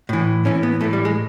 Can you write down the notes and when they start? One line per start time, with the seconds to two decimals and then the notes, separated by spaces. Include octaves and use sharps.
0.09 A2 E3
0.45 A2 E3 C#4
0.63 B3
0.81 A2 E3 A3
0.93 G3
1.05 G#3